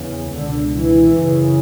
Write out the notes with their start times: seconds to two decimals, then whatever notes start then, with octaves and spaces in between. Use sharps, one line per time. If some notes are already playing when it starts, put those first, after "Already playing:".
Already playing: E2 C#3
0.33 C#2 B2 D3
0.75 E3
1.17 F#2 C#3